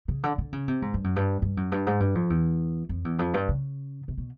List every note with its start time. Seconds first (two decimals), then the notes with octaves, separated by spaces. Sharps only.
0.08 C#3
0.23 D3
0.38 D3
0.53 C#3
0.68 C3
0.82 G#2
0.94 G2
1.04 F#2
1.16 G2
1.42 G2
1.57 F#2
1.72 G2
1.87 G#2
2.00 G2
2.15 F2
2.30 E2
2.89 F2
3.05 E2
3.19 F2
3.34 G2
3.49 C#3
4.08 C3
4.18 B2